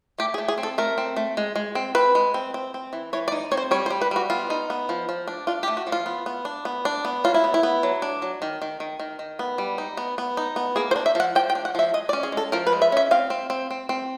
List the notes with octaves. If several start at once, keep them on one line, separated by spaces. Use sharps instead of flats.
A3 G4
G#4
A3
G#4
C4
A4
A3 A#4
C4
A3
G#3
G#3
C4
C4 B4
G#3
C4
C4
C4
E3
E3 C#5
D5
D#4
C4 C#5
C5
G3 C#5
C5
G3
B4
G3 F#4
B3 F4
D#4
B3
F3
F3
D4
D4 F4
G4
A3
F#4
F3
F4
B3
B3
D4
B3
D4
B3
F#3 F4
E4
B3
E4
B3
F#3
D4
F#3
D#3
D#3
D#3
D#3
D#3
B3
G3
D#4
B3
B3
D#4
B3
A#3 G#4
C5
D4
E5
F3 F#5
F3 G5
G5
D4
F#5
F3 E5
G#3 D#5
D5
C#4
G#4
G#3 A4
F3 A#4
B4
G#3
E5
C#4 E5
C4 F5
C4
C4
C4
C4